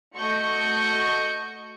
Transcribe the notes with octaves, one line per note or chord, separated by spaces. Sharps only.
A3 F#4 D#5 C#6 G6 C#7